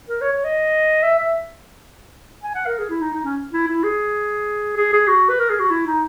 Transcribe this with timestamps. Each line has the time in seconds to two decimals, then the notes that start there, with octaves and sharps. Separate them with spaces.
0.09 A#4
0.21 C#5
0.32 C#5
0.44 D#5
1.03 E5
1.18 E5
2.43 G#5
2.55 F#5
2.66 A#4
2.79 G#4
2.90 E4
3.01 D#4
3.13 D#4
3.24 C#4
3.53 E4
3.68 E4
3.84 G#4
4.77 G#4
4.93 G#4
5.08 F#4
5.29 B4
5.39 A#4
5.50 G#4
5.60 F#4
5.71 E4
5.86 D#4